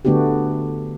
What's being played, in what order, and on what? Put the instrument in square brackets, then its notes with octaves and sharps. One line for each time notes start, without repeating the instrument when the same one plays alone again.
[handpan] D3 A3 B3 D4 F#4 G4